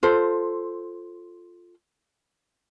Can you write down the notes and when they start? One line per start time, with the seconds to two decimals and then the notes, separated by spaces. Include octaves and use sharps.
0.03 F4 A4 C5